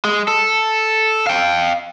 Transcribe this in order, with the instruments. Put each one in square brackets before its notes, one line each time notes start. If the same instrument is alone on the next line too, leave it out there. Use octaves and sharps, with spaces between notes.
[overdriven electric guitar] G#3
A4
F5 G5